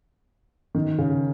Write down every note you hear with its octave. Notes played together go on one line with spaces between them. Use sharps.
D#3
C#3